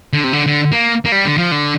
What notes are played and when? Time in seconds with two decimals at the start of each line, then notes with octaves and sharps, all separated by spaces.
0.13 D3
0.24 C3
0.33 D3
0.47 D3
0.72 A#3
1.05 A#3
1.12 G3
1.25 D3
1.38 F3
1.51 D3